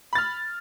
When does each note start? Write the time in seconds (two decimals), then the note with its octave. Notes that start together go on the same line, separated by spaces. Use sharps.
0.13 B5
0.15 A6
0.18 F6